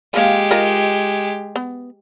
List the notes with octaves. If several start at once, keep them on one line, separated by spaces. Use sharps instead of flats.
F3 G#3 A#3 G4 F5
F4 A#4 D#5
B3